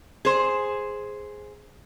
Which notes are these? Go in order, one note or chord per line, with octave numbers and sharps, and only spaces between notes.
G#4 C5